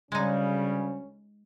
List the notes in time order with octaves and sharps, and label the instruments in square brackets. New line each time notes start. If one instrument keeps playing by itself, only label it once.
[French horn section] D2 C#4 [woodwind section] C#3 G3 [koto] G#3 D#4